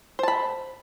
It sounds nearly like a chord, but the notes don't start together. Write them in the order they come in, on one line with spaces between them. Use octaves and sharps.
C5 A5 B5